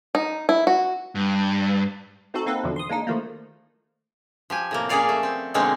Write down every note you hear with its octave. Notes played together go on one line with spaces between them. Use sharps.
D#4
E4
F#4
G2
A3 C4 D#4 F#4 A4
A#3 C4 D#4 A4 B4
E2 B2 D3 F3
C6 D#6
G#3 A#3 D4 D#4
D3 D#3 F3 A3 A#3
F3 G4 G#5
A2 C3 A#3
A#2 C#4 G#4 C#5 D5 F5
A3
C4
B2 D3 G#3 A#3 C4 C#4